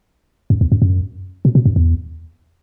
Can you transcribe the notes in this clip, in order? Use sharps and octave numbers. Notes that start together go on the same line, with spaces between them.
F#2
E2
F#2
F#2
B2
B2
F#2
E2